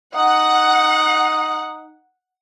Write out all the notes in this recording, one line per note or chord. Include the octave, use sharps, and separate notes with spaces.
D#4 F#5